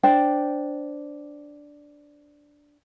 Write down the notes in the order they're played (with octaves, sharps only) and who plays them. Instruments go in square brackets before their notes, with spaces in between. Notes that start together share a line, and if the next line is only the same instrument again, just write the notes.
[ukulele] D4 C5 G5